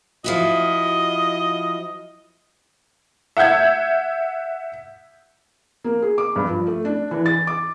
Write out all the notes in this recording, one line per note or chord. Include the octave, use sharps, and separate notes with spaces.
F3 E4 F#4 D#5
E5 F#5 E6 G6 G#6
A#3
G#4
D6
G2
F3
A3
D4
E3
A6
D6